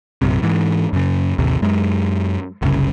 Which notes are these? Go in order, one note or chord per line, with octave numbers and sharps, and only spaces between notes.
A#1 F#2 C3
G#2 E3
F#2 C#3
A1 D#2 C3
F#2 G#3
F#1 C2 C#3